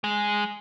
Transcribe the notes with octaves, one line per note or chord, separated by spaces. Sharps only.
G#3